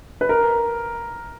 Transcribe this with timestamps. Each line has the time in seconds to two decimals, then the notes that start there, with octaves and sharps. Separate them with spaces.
0.21 B4
0.29 A#4